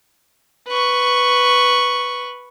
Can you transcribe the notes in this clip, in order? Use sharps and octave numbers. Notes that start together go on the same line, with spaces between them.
B4 C#6